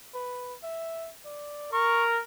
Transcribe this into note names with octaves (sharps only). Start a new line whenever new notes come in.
B4
E5
D5
A#4 C#6